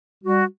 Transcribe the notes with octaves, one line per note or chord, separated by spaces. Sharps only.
G3 F#4